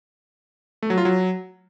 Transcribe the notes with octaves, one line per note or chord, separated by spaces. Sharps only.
A3
F#3
F4
F#3